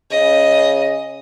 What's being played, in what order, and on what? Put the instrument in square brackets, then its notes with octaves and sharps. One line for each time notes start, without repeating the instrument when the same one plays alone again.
[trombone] C#3 [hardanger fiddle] D#5